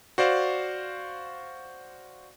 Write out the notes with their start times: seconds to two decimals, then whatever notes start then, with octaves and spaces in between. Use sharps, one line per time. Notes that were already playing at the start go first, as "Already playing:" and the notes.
0.18 F#4 C5 D5 F5